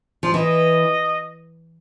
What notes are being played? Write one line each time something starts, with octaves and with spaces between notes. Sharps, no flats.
F3
E3 D#5